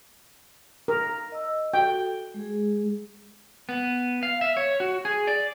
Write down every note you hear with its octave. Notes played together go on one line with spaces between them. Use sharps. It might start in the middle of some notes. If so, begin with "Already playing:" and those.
A#4
D#5 E6
F#4 A4 G5
G#3 G#4
B3
F5
E5
C#5
F#4
G#4
D5